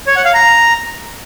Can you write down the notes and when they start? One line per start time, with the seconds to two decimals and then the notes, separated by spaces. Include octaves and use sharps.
0.07 C#5
0.16 F#5
0.25 F5
0.34 A#5